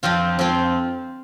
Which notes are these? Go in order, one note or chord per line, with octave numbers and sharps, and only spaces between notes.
F2 F3 C4 F4
F2 F3 C4 F4